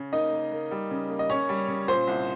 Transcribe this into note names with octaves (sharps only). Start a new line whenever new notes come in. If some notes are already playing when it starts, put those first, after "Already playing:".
Already playing: C#3
A#3 D#4 D#5
A#3
A#3
G3
C#3
A#3
D#5
C#3 C#4 C#5
G3
C#3
A#2 C5
C2